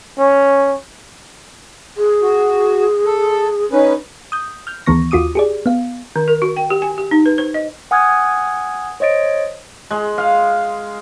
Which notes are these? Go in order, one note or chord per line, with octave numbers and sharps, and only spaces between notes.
C#4
G#4
F#4
A4
C#4 D#4 B4
D#6 G6
F6 G6
D2 D#3 E3 B3 C#6 A#6
D#2 F4 F#4 D6 D#6 D#7
G4 G#4 D5
B3 F5
D#3
A#4
F#4
G5
G4
G#5
G4
D#4
B4
C5
D#5
F#5 G#5 D#6 F6 F#6 G#6
C5 C#5 D#5 A6 D7
G#3
F5